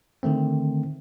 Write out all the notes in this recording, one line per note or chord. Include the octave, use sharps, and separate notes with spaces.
D3 D#3 A3 C4